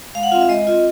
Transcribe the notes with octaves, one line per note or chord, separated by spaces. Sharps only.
G#3 F5
F#5
C4 F4 F5
E5
G#3 D#5
C4 F4 D#5